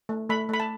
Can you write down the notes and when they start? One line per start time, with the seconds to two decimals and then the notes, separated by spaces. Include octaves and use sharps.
0.09 A3
0.30 A3 B5
0.49 A3 B5
0.60 A5